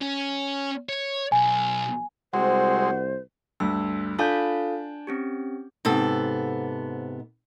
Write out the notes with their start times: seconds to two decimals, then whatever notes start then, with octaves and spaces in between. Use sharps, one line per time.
0.01 C#4
0.89 C#5
1.32 B1 G#5
2.34 C2 G#3 C4 F#4 C5
3.60 D2 G2 E6
4.19 D4 F4 A4 F5 G#5 G6
5.07 C4 C#4 G4
5.85 G#2 C3 B3 A4